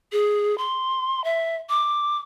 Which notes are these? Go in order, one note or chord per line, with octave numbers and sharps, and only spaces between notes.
G#4
C6
E5
D6